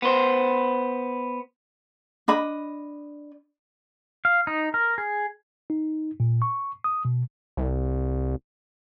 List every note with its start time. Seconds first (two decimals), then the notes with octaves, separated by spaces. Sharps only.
0.02 B3 C5
2.28 D4 D#5 B5
4.25 F5
4.47 D#4
4.74 A#4
4.98 G#4
5.70 D#4
6.20 A#2
6.42 C#6
6.84 D#6
7.05 B2
7.57 C2